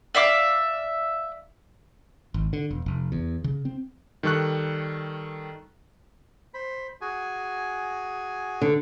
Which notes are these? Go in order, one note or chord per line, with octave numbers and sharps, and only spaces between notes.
D5 E5 F5 D6
G#1
D3
E1
F1
E2
C#3
C4
D#3 G3 A4 C#6 F#6
C5 B5
F#4 G#4 G#5
D3